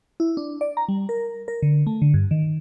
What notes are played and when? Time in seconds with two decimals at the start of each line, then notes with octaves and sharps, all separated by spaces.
0.20 E4
0.37 D4
0.61 D5
0.77 A#5
0.89 G3
1.09 A#4
1.48 A#4
1.62 D3
1.87 A3
2.02 D3
2.14 G2
2.31 D#3